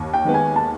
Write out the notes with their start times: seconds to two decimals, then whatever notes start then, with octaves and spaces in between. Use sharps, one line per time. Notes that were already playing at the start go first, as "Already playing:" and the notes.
Already playing: D#2
0.14 G5
0.25 D#3 G#3 B3
0.34 G#5
0.56 A5